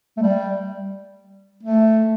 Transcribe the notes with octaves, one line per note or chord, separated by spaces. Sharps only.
A3
G3
A3